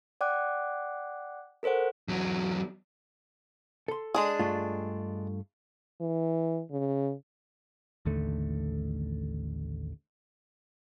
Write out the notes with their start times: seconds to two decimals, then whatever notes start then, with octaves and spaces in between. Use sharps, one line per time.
0.21 D5 F#5 G5 D6 F#6
1.63 A4 A#4 C5 C#5 F#5
2.08 E2 F#3
3.88 A4 C6
4.14 G#3 D4 G#4
4.39 G2 A3 F4
6.01 E3
6.71 C#3
8.05 A1 D#2 D3 A3